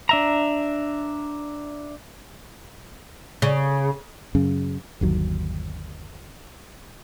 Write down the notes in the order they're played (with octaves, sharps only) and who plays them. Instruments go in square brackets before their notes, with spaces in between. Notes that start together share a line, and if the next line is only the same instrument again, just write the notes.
[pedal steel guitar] D4 E5 A#5
[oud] C#3
[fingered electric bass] F#2 C#3
G1 D#2 F#3